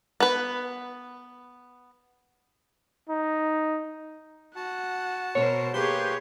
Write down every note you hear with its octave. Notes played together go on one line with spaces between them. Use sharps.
B3 B4
D#4
F#4 F#5 A5
B2 A#4 C5 C#5
A#3 G4 G#4 B4 C#5 C6 G6